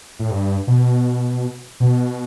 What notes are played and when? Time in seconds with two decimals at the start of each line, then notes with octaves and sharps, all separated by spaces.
0.19 A2
0.31 G2
0.67 B2
1.80 B2